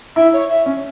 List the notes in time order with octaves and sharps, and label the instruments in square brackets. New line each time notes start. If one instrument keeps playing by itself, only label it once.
[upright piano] E4 [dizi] E5
[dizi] C#5
E5
[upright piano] C#4